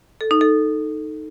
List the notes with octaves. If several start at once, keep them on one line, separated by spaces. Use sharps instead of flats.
A4
D#4
A4